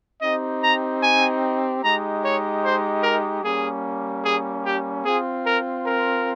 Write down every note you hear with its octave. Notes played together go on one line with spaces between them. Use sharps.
C4 D#4 G4 D#5
A#5
G#5
G#3 D#4 G4 A#5
C#5
C5
A#4
G3 A#3 C#4 G#4
G#4
G4
C4 F4 G#4
A#4
A#4